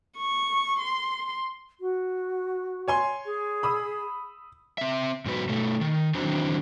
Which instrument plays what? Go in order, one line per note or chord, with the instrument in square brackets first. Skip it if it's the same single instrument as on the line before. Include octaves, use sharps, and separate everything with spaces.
[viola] C#6
C6
[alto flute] F#4
[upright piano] C#5 G#5 C6
[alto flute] G#4
[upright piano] B5 D#6 E6
[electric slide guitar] C4 E5
G#2 B2 F#3 B4
B2 A3
D#3
D#3 E3 F#3 C4 D4